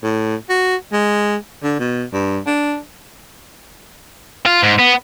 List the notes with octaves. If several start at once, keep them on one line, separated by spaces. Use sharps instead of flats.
A2
F#4
G#3
D3
B2
G2
D4
F4
G#2
B3